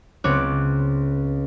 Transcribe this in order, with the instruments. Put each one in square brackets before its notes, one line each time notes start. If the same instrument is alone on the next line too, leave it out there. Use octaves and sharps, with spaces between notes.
[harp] C#2 B3 C4 C#5 D6 F#6